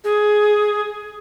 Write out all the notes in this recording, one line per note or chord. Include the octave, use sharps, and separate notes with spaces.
G#4